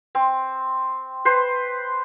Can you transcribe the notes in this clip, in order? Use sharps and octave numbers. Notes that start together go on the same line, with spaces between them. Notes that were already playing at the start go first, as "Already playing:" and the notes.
C4
B4 C5 C6